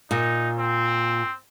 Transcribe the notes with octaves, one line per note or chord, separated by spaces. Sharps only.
A#2 D#4
C4